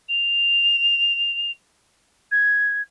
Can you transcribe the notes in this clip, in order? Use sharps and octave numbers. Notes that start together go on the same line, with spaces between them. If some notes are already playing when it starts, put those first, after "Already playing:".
F7
G#6